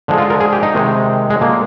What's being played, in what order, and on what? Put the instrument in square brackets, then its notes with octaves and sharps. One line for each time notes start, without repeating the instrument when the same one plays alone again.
[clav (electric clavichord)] D3 F3 G#3
F4
A#4
G#4
G4
D#4
C3 D#3 G#3
G#3
D3 F3 G#3 A#3